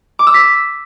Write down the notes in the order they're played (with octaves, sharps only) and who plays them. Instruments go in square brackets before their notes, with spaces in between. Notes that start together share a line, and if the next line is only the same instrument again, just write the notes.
[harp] D6
E6
B6